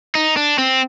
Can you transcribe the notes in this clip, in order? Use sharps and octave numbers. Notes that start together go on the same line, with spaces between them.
D#4
D4
C4